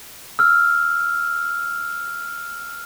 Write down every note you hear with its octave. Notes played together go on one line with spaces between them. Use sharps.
E6 F6